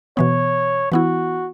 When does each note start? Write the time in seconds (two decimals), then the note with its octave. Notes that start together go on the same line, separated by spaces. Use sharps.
0.17 B2 E3 B3 C#5
0.92 E3 B3 E4 F#4